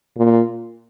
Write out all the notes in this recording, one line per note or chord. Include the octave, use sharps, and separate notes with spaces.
A#2